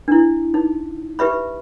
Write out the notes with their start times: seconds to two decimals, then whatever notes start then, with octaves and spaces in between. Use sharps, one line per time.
0.08 D4 E4
0.54 D#4
1.19 G4 B4 E5 B5